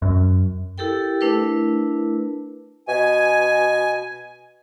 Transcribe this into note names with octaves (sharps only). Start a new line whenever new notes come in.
F#2
E4 G4 A4 A#4 G5
A3 D4 E4 A#4 B4
B2 G#5